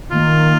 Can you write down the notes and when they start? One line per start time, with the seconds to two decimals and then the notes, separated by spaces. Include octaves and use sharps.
0.10 D#3 A#3 F4